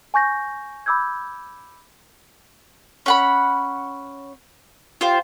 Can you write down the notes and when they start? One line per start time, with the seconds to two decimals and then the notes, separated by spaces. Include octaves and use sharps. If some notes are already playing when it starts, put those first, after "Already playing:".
0.14 G#5 C#6 G6 A#6
0.86 B5 D6 E6 G6 G#6
3.06 C#4 F#5 B5
5.01 F4 G4 C5